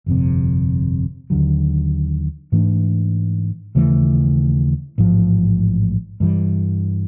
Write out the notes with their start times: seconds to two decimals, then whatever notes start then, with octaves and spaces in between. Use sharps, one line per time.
0.06 G1 F2 C3
1.30 D#2 D3 F#3
2.52 G#2 E3 A3 D4
3.75 D#2 C#3 E3 A3
4.98 A1 G#2 F3
6.20 G2 E3 G3